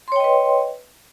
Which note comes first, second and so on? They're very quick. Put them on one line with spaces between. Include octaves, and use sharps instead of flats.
C6 C#5 G5 D#5 B4